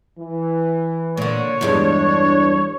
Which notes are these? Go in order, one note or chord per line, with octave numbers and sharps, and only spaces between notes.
E3
A#2 D3 C#5
E2 G2 G#3 D4